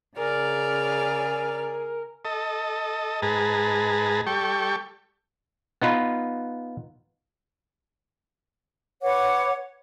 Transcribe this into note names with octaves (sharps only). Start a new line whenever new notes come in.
C#3 G#4 A#4 D5 F6
A4 D#5
G#2 G#4 B4 A5 A#5
G3 A4 G5 C#6
B3 D#4 F4 B4
B4 C#5 F#5 D6